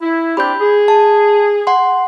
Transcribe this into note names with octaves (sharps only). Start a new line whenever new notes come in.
E4
C4 D4 G4 B5 G6
G#4
A5
F#5 C6